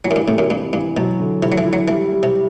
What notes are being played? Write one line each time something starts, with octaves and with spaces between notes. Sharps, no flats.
E3 F#3
F#2
G2
A2 C3
F#2
G2 E3
G2 E3
B2 F#3
D3
C3 E4
F#3
E3
E4
F#3
E3 G3
G3
C3